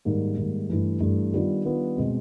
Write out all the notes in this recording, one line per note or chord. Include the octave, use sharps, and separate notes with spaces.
G#2 D#3 G3 A#3
G#2 D#3 G3 A#3
G2 E3 A3
G2 E3 A3
D#3 G3 B3 D4 F4
D#3 G3 B3 D4 F4
B2 G#3 C4